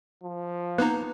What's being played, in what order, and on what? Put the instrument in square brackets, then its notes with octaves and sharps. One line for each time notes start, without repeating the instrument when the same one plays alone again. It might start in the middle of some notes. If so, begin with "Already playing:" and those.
[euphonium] F3
[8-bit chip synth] A#3 B3 D#4 [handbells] B4 A#5